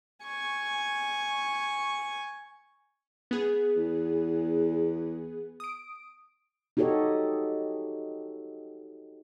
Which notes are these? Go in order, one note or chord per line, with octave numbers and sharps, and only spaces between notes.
G#5 C#6
B3 G#4
E2
D#6 D7
D#4 F#4 G4 A4 C#5 D#5